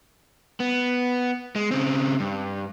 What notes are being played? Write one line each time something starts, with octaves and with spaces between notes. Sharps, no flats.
B3
G#3
C#3 C4
G2